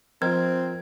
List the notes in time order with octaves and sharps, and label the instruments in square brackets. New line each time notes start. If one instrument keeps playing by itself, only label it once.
[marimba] F3 [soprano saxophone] C4 [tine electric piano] F4 A#4 [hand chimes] G#6